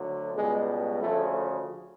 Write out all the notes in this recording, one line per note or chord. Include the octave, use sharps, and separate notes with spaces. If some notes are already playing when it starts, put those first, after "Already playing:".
Already playing: D2 D3 F#3
C#2 B2 G3 G#3
D2 C#3 F3 A3